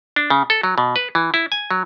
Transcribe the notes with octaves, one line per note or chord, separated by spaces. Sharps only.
D4
C#3
A4
F#3
B2
B4
E3
E4
G#5
F#3